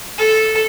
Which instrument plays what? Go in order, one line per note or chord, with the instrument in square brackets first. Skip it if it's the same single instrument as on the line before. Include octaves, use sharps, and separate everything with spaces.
[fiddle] A4